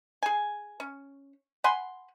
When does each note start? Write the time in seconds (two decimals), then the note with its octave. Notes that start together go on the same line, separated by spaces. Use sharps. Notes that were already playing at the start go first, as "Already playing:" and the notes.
0.23 G#4 G#5
0.80 C#4
1.64 F#5 G#5 B5 C6